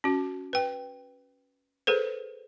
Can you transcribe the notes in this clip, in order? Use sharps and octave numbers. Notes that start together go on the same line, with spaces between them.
C#4 F#4
B4 G5
G#4 A4 B4 C5